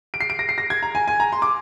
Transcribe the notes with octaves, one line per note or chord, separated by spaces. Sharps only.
D7
C7
D7
A#6
C7
A#6
G#6
A#5
G#5
G#5
A#5
C6
D6